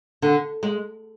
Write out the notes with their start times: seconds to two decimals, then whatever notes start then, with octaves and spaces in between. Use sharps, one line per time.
0.22 D3
0.63 G#3